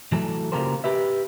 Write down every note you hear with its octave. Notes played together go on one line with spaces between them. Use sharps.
E3 F#3 A3 A4
C#3 A#3 F4 G4 A#4 C5
G4 B4 E5